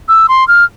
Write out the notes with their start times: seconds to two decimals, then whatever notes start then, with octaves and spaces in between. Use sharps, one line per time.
0.08 E6
0.28 C6
0.48 F6